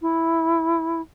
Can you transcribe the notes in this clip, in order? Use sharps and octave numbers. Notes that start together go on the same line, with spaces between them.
E4